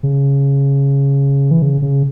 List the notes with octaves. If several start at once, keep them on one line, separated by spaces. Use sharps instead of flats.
C#3
E3
C#3
C#3